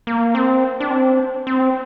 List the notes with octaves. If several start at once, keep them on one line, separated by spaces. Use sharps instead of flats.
A#3
C4
D4
C4
C4